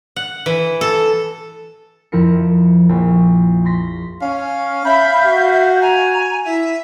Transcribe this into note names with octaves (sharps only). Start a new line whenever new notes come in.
F#5
E3
A4
F2 F3 E4 A#4 C#7
A#1
C6 A#6 B6
C#4 F5
E5 B5 G6
F#4
G#5 A#5
E4 E5